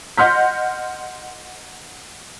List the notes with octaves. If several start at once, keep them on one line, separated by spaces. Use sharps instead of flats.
D#5 F#5 C6 F6 G6 B6